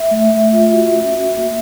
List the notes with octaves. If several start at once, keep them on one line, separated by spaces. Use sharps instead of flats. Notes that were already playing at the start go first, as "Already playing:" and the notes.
Already playing: E5
A3
A3
F4
F#4
C#4
F#4
A#3